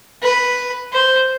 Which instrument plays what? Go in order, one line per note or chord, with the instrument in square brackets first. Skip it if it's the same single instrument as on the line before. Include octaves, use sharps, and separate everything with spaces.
[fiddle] B4
C5